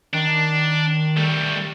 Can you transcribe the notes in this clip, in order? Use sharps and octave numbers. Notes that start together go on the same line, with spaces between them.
D#3 D4
G3 A3